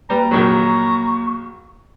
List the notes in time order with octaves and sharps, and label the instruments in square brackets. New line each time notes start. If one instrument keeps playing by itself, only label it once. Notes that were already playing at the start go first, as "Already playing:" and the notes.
[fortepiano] G3 [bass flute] A#3 [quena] B4 [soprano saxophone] A#5
[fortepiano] A#1 D#3 F#3 [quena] C#6